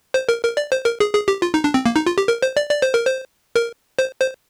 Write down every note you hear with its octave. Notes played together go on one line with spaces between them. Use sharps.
C5
A#4
A#4
D5
C5
A#4
G#4
G#4
G4
F4
D#4
D4
C4
A#3
D#4
F4
G4
A#4
C5
D5
D5
C5
A#4
C5
A#4
C5
C5